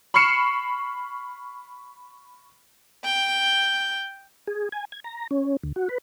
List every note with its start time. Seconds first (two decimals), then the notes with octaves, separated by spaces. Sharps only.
0.14 B5 C#6 F6 C7 C#7 E7
3.05 G5 G6
4.47 G#4
4.72 G#5
4.92 G#6
5.04 A#5
5.31 C#4
5.64 D2
5.76 F#4
5.89 B4